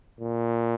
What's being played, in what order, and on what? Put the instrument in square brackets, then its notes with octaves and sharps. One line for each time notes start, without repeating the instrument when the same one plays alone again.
[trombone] A#2